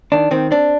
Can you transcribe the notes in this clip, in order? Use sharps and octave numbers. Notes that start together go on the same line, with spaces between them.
D#3 D4
D#3 C4
C4 D4